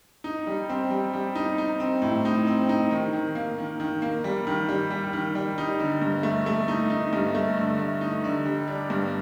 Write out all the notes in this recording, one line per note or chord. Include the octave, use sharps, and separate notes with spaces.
D#4
G3
C4
G3
G3
D#4
D#4
C4
A2
D#4
C4
D#4
D#3
D#3
A#3
D#3
D#3
A#3
G3
D#3
G3
G3
D#3
G3
D#4
D3
G2
A3
A3
D#4
D#4
G2
A3
D3
A3
D#4
D3
G3
D4
G2